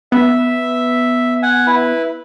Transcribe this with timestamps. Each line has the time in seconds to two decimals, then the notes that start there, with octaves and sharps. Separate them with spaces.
0.12 B3 E5
1.43 F#5 G#5
1.67 E4 B4